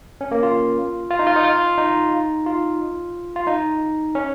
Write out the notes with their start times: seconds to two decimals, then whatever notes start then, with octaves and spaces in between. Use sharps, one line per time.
0.21 C#4
0.31 A#3
0.43 F4
1.10 F4
1.19 D#4
1.27 F4
1.36 D#4
1.45 F4
1.78 D#4
2.46 F4
3.36 F4
3.47 D#4
4.15 C#4